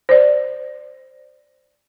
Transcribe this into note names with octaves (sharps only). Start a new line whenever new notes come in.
C5 D5